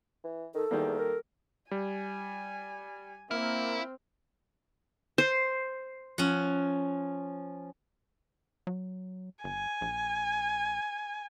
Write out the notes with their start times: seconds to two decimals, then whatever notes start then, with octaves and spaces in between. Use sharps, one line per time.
0.24 E3
0.55 D#3 A4
0.71 E2 D#3 G3 A#3
0.98 A#4
1.71 G3 G#5
3.31 A#3 C4 E4 F6
5.18 C5
6.18 F3 C#4 F#5
8.67 F#3
9.44 G1 G#5
9.81 A#1